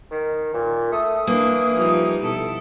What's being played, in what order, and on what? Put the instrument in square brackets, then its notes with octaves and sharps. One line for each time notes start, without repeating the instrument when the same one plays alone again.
[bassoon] D#3
A#2
[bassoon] A3 [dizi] D#6
[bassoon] E3 [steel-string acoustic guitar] A#3 [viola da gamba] D4
[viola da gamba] F3 G3 D#4
B2 E4 A4